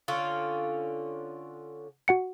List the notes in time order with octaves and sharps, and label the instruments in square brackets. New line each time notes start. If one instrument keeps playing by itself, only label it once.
[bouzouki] D3 C#4 F4
[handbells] F#4 F#5 C#7